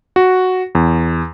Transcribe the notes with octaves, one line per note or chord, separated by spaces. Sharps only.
F#4
E2